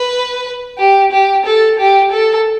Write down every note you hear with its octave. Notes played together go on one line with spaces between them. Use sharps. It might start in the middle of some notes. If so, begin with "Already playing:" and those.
Already playing: B4
G4
G4
A4
G4
A4